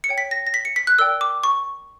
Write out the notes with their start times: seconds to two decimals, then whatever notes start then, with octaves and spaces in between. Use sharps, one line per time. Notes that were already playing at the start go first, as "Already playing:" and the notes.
0.04 C#7
0.09 C#5 G5
0.18 B6
0.31 A#6
0.47 A#6
0.54 B6
0.65 C#7
0.76 B6
0.87 F#6
0.99 A#4 D5 G5 E6
1.21 D6
1.44 C#6